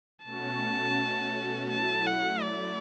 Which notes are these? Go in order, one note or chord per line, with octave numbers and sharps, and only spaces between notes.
B2 A3 C#4 F#4 A5
F#3 A3 E4 A5
F#5
D5